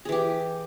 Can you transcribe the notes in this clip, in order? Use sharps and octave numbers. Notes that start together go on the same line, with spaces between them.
E3 G4 G#4